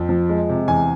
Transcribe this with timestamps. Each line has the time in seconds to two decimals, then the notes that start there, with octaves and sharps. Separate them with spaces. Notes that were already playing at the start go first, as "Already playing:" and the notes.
Already playing: F2
0.09 F3
0.29 G#3
0.49 C3
0.68 E2 G#5